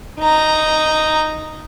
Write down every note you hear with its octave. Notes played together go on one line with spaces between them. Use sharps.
D#4 A#5